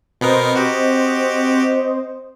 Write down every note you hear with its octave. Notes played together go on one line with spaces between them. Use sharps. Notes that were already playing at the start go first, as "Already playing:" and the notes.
B2 B3 C4 A#4 C5 D#5
F#4 G4